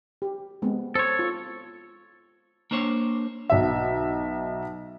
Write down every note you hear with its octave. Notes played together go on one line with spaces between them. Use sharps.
G4
G#3 B3 C4
A4 C5 C#5
F4
A#3 D4 C5 C#5
B1 E5